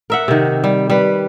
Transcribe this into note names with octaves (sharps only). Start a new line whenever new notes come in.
A#4 E5 F#5
C3 D#3
G3
G3 B4